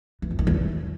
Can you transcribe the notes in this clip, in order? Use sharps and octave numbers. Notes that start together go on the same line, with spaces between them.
E3
F2
D#3
E2